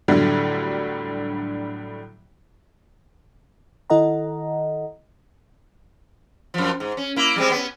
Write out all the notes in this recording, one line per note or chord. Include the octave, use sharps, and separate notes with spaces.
A2 D3 F#3 G3 A3
D#3 E4 A4 D#5 F#5 A#5
F#2 F3
G#2
C#4
A#3 E4
G3 G#3 C4
B3 C#4